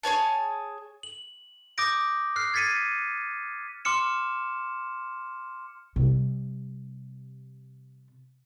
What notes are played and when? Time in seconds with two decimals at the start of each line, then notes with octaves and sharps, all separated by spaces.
0.03 G#4 C#5 G#5 A5
1.03 F#7
1.78 D6 D#6 G6 A#6 D7
2.36 F6 F#6 C7
2.54 G#6 A6 B6 C#7 D#7
3.85 C6 D6 F6 C#7 E7
5.96 C3 G3